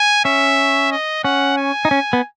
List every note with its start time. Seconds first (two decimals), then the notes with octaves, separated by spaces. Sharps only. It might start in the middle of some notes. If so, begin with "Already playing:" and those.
Already playing: G#5
0.25 C#4 E5
0.92 D#5
1.24 C#4 F#5
1.57 G#5
1.85 D#4
1.91 C#4
2.13 B3